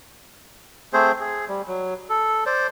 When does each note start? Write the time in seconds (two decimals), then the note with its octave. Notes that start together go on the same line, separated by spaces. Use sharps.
0.93 A3 C4 G#4 C5
1.20 G#4
1.49 G3
1.68 F#3
2.09 A4
2.46 C5 D5